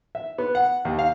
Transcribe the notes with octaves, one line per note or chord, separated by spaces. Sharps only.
E5
B3
F#5
D#2
F5